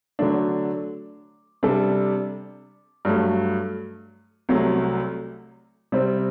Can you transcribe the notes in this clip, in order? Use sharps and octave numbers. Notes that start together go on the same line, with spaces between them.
D3 F#3 A3 D4
C3 G3 D4 A4
G2 F#3 A3
C2 C3 F#3 A3
C3 G3 C4